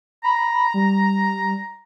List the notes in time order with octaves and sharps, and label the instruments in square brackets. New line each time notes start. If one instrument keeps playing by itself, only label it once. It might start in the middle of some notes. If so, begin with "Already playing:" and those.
[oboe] A#5 [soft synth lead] B5
[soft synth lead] G3